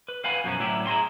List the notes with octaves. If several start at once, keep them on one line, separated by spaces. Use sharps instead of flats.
B4
B4 F5 F#5 G#5 B5
F#2 B2 F3 A#3 C#4
A2 D3 F#3 C#4 E4 G4
E4 G#4 A#5 C6